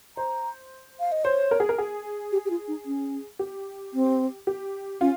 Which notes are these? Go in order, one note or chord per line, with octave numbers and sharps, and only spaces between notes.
C5 A#5
F5
D#5
C5 C#5
A#4
G#4
A#4
G#4
G4
G4
F4
D#4
C#4
G4
C4
G4
C#4 F4